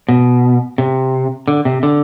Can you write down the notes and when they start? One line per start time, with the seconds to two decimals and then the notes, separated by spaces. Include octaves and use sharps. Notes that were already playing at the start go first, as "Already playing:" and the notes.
0.09 B2
0.78 C3
1.48 D3
1.65 C3
1.83 D3